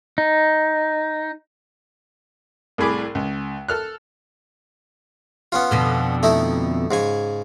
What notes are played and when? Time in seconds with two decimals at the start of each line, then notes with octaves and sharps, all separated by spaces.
0.18 D#4
2.78 C2 A2 G#4 B5 D6
3.15 C#2
3.68 A4 F6 F#6
5.52 B3 C#4 F4
5.71 F2 B2 D3
6.23 A3 D#4 E4
6.91 G#2 C#3 G#5